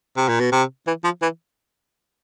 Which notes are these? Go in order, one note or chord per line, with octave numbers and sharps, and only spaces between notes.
C3
A#2
B2
C3
E3
F3
E3